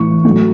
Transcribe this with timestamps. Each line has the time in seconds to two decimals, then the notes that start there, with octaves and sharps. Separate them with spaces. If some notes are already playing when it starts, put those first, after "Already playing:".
Already playing: A2 E3 C#6
0.25 A2 F#3